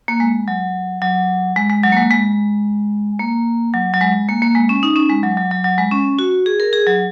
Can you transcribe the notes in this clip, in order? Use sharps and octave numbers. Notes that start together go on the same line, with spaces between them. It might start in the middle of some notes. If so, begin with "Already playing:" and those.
A#3
G#3
F#3
F#3
G#3
G#3
F#3
A#3
G#3
G#3
A#3
F#3
F#3
G#3
A#3
A#3
G#3
C#4
D#4
C#4
G#3
F#3
F#3
F#3
F#3
G#3
C#4
F#4
G#4
A#4
G#4
F#3